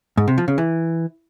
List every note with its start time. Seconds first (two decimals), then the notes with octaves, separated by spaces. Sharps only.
0.17 G#2
0.28 C3
0.38 F3
0.48 C#3
0.58 E3